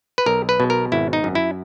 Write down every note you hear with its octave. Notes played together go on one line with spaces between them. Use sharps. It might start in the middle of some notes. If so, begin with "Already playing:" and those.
B4
B1 A#4
B4
B2
A#4
G#1 E4
D#4
F#2
E4